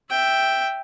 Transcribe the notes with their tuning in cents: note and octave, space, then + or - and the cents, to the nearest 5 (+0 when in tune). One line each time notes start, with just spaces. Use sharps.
E5 +0 G5 +0